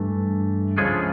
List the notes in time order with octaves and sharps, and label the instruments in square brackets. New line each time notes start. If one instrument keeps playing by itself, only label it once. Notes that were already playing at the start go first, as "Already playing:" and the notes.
Already playing: [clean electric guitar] G2 E3 A3
C#2 C#3 F3 G#3 A3 G#4